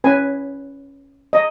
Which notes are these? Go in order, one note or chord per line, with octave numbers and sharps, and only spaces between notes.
C#4 B4 G#5
D#5